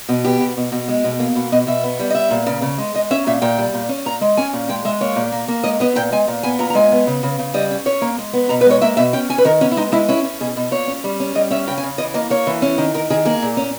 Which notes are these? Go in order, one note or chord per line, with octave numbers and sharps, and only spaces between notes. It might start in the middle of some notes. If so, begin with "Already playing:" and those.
B2
B3 G4
B2
B2
B2
G#3
B2
A#3 G#4
B2
B2 D#5
B2 E5
B3
G3
D#5
B3 E5
A#2
C#3
C#3
G#3
G#3 D#5
C#4 E5
A#2 E5
A#2 G5
G3
A#2
C#4
A#2 A#5
G#3
C#4 G#5
A#2
G#3 G5
G#3 E5
A#3 C#5
A#2
A#3
A#3
G#3 D#5
B3 D#5
A#2 G5
G#3 G#5
A#2
B3 G#5
A#2 A#5
A#5
G#3 G#5
B3
C#3
C#3
C#3
G3 D#5
C#4
C#4 C#5
A#3
G#3
B3
B2 A#5
B4
G#3 C#5
A#3 E5
B2 E5
C#4 G5
C#4 G#5
B4
D#3 A#4
B3 C#4
E4
G#3 D#4
G#3 E4
C#4 E4
C#4
B2 G#4
B2
A#2 C#5
C#4
G3
C#4
G3 D#5
C#4 E5
C#3 G5
G#5
C#3
E3 D#5
A#3 D#5
A#3 C#5
E3
C#4
D#3
D#3 A#4
D#3 G#4
A#3 G#4
A#2
C#4